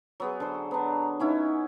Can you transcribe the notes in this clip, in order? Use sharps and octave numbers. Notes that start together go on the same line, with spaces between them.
F#3 B3 G#4
D3 C5
B3 D4 A#5
B3 C#4 D#4 E4